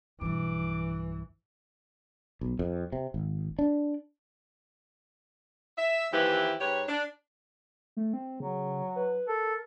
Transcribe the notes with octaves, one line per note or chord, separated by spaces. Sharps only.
B1 G2 E3 D6
B1
F2
C3
G#1
D4
E5
D#2 E3 F3 E4 G4 B4
G#2 G4 B4 C#5
D4
A3
C4
C#3 F#3
B4
A4 A#4